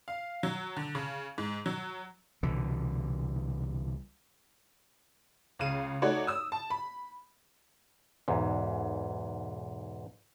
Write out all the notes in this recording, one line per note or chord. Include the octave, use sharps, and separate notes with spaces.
F5
F#3
D3
C#3
G#2
F#3
C2 B2 D3 E3
C#2 C#3 F5 D#7
A3 D#4 F#4 C#5 D5
D#6 E6
A5
B5
B1 E2 G#2